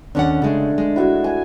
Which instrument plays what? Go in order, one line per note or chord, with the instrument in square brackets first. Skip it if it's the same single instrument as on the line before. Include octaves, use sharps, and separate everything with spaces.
[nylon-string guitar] D#2 C#4 F#5 [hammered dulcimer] D3 D4
[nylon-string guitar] C#3 G#3 [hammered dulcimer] A3 G#4
[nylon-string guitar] G#3
[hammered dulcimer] E4 F#4 E5
G#5